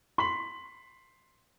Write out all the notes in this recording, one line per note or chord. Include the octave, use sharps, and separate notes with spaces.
C6 B6 F#7